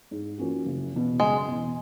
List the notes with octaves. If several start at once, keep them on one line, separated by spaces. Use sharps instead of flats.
G#2
F3 A#3 C#4 F#4
F#1
E2 B2
F#1 G#3
E2 B2